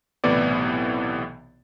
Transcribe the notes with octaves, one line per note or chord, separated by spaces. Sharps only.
B1 A2 C3 E3 B3 D5